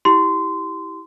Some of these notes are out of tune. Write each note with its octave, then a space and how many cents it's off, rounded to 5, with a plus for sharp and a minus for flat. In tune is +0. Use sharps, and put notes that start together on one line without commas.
E4 -20 G4 -15 C6 -20